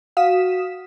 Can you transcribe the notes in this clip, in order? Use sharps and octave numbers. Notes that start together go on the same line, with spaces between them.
F#4 F5 D#6 B6 E7